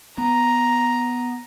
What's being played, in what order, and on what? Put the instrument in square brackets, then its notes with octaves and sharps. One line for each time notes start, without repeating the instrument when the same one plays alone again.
[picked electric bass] B3 [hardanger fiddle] A#5